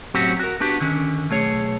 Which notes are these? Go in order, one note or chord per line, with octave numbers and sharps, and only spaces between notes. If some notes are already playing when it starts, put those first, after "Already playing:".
A2 F#3 C4 C#4 F#4 G4
F#4 A#4
B3 D4 F#4 G4
D3 D#3 C#4
B1 A3 G#4 C#5